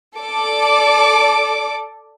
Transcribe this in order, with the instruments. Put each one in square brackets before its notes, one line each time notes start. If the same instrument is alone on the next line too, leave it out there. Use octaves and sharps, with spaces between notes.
[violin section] A4 D5 D6